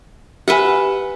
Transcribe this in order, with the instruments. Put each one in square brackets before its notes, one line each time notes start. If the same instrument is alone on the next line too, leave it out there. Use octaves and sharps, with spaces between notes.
[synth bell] G4 G#5 [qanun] B4 E5 F#5